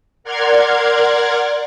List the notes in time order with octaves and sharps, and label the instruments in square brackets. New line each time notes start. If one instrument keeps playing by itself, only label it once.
[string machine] A#4 D5 F#5 C6 F6 G#6